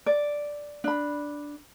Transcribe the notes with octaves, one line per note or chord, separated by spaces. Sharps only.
D5
D4 B5